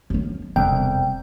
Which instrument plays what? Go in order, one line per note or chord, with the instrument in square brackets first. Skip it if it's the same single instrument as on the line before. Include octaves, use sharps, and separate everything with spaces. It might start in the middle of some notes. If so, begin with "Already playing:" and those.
[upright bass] F#2 D#3
[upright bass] E1 F2 [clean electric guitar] C2 [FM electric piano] G5